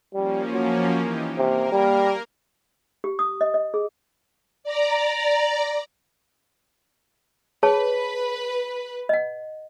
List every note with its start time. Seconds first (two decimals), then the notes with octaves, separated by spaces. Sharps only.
0.14 F3 G3 A#3 C#4
0.53 F#3
0.96 E3 D#4 G4
1.38 C3 A#3 A#4
1.72 G3
3.04 G4
3.19 D#6
3.41 D#5
3.54 D#5
3.74 G#4
4.64 D5 A#5
7.63 G#4 B4 C#5 A5
9.09 D#5 F#5